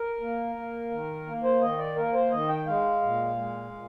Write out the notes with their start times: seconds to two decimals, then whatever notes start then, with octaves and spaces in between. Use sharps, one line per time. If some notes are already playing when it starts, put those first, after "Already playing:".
Already playing: A#4
0.20 A#3
0.55 A#3
0.91 D#3
1.26 A#3
1.44 C5
1.61 D#3 D#5
1.78 D5
1.96 A#3 A#4
2.14 C5
2.31 D#3 D#5
2.49 G5
2.66 G#3 F5
3.02 A#2
3.36 G#3
3.72 A#2